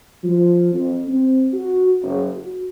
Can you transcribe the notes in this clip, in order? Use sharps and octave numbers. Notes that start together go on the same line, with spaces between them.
F3
F2
C4
F#4
F#1
F#4